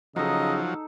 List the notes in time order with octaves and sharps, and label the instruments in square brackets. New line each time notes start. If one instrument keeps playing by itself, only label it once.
[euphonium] C#3 [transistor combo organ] F3 F#3 [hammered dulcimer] D#4 A4 [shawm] D#5